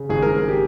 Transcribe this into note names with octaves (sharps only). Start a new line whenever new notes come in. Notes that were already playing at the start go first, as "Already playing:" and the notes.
Already playing: C#3
G#1 G#4
A#4
G#1
G#4
G4